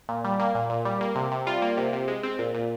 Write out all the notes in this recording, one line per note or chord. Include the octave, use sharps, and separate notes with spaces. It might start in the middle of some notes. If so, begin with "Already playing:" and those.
A#2
G3
A#3
A#2
A#2
G3
A#3
C3
C3
G3 F4
A#3
C3
C3
G#3
C4
A#2
A#2